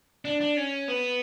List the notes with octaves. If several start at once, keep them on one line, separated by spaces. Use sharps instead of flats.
D4
D4
C#4
B3